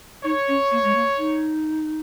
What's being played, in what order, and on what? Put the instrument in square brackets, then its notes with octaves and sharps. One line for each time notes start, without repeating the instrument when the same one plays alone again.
[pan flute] D#4 [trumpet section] C#5
[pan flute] C#4
A#3
G#3
A#3
D#4